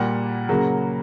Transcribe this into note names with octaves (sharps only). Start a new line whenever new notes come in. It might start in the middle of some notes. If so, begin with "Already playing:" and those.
Already playing: A#2 G3 A#3 F#5
C#3 F#3 A#3